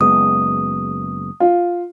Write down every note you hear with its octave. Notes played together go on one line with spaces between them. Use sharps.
F#1 G#3 B3 D#6
F4